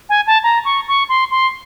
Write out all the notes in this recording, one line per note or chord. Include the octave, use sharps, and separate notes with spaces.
G#5
A5
A#5
C#6
C#6
C6
C6